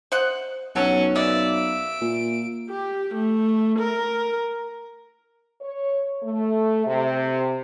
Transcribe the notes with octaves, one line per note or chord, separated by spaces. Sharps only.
C5 D#5 F#5
B1 F#3 C#4 A4
A#3 B3 D5 E5
D7
A#2
G4
A3
A#4
C#5
A3
C3